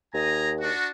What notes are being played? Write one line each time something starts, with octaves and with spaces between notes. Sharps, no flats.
D#2 D#5 G#5 A#5
D4 F#4